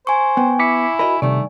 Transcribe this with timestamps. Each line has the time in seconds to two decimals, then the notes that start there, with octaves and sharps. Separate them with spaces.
0.07 C5 G#5 C#6
0.37 B3 G5
0.59 E4 D6 B6 C#7
0.99 F#4 A#4 D#5 B5
1.22 G2 C3 D#3 A3 D5